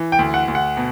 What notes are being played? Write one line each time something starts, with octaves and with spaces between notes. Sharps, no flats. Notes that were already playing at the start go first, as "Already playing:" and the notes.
Already playing: E3
G5
D2
F#5
D2
F#5
B2